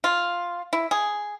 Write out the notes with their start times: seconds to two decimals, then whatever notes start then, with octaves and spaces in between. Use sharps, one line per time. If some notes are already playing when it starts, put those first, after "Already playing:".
0.04 F4
0.73 E4
0.91 G#4